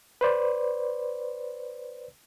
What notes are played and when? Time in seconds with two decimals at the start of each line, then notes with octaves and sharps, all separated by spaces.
0.21 B4 C5 D5